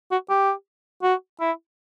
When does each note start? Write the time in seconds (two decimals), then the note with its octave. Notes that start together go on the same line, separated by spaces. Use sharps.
0.12 F#4
0.30 G4
1.03 F#4
1.40 E4